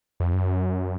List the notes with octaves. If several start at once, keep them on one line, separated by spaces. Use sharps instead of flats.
F2
F#2